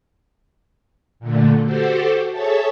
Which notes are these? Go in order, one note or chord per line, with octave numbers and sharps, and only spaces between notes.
A#2 D3 A3
F#4 G4 A4 C5
G#4 A4 C#5 E5 A5